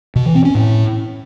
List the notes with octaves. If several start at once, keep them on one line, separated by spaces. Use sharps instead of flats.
B2
E3
C4
C#4
A2